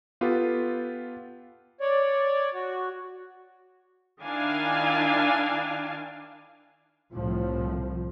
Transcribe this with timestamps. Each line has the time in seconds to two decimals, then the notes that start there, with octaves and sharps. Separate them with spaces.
0.21 B3 F4 G4 A4 B4
1.81 C#5 D5
2.54 F#4
4.24 D#3 D4 E4 F5 G#5
7.13 C2 A2 C3 F3